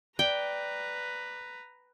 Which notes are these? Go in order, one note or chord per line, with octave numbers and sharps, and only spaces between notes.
B4 D5 G5 A#5